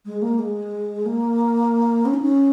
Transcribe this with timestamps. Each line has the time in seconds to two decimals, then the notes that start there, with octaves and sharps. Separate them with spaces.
0.06 G#3
0.22 A#3
0.39 G#3
1.06 A#3
2.06 C#4
2.14 D#4
2.22 C#4